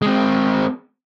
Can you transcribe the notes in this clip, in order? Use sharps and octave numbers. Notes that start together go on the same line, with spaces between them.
G#3 C4